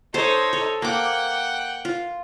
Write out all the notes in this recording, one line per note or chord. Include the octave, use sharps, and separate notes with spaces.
D#4 A4 C5 C#5
A4
A#3 F#5 G5 D6
F4